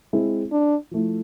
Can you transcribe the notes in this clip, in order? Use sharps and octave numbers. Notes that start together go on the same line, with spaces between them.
G#3 C4 E4 G#4
D4
F3 A3 E4